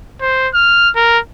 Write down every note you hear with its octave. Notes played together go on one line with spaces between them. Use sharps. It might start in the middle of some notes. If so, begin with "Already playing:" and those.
C5
F6
A#4